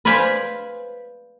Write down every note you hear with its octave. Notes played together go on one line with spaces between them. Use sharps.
B4 C5 D5 F5 G#5 B5